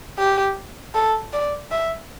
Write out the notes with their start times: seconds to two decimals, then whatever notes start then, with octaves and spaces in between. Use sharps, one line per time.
0.18 G4
0.94 A4
1.33 D5
1.71 E5